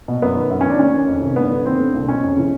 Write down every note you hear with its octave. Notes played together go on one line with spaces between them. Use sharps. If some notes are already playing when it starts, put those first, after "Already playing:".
B2
F#2 B3
D#3
F#2
C#4
D#3 D4
D#2 C#4
D#3
F2
C3 D#3
G2 B3
D3
D#2 C4
D3
C2
B2 C#4
F2
C#3 E3